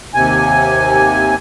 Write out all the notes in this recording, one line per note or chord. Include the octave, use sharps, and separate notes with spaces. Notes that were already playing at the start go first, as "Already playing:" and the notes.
D#2 C3 G#5